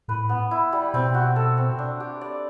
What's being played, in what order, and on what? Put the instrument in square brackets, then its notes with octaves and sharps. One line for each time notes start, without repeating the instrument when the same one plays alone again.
[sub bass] A2 [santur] B4
[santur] B3
E4
G3
[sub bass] B2 [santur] C4
[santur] F#4
A4
C4
D4
G4
D5